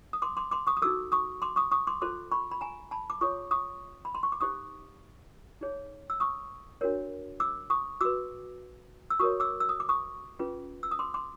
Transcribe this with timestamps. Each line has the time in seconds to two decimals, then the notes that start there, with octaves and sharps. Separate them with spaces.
0.13 D#6
0.22 C6 D6
0.37 C6 D6
0.51 C6 D6
0.67 C#6 D#6
0.77 D#6
0.82 D#4 F#4 A4 D6 E6
1.12 C#6 D#6
1.42 C6 D6
1.56 C#6 D#6
1.71 C#6 D#6
1.87 C6 D6
2.02 F4 A4 C5 C6 D6
2.32 B5 C#6
2.51 B5
2.61 G#5 A#5
2.91 A5 B5
3.10 D6
3.21 F4 G#4 C#5 C#6 D#6
3.51 C#6 D#6
4.05 B5
4.15 C6
4.23 C#6
4.32 D6
4.41 D#4 G4 C5 C#6 D#6
5.61 D#4 G#4 C#5
6.10 E6
6.20 C#6 D#6
6.81 D4 F#4 A#4 C#5
7.40 D6 E6
7.70 C#6 D#6
8.01 F#4 B4 D6 E6
9.10 E6
9.19 F#4 A#4 C#5 C#6 D#6
9.40 D6 E6
9.60 E6
9.69 D#6
9.80 D6
9.89 C#6 D#6
10.39 C#4 F4 G#4 B4
10.83 E6
10.91 D#6
10.99 C6 D6
11.14 C6 D6